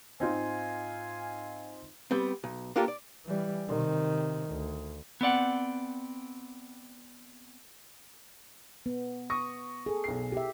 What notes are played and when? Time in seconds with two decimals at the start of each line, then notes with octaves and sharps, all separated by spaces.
0.20 G#2 C4 D#4 F4 F5 G#5
2.11 G3 B3 C4
2.44 B1
2.76 A#3 D4 F4 G4 A4 A#4
2.88 D5
3.26 E3 G3
3.68 C3 D#3
4.49 D2
5.21 B3 C4 D5 F#5
8.86 B3
9.30 C#6 D#6 A#6
9.86 G#4 A4
10.04 B1 C7
10.32 G4 E5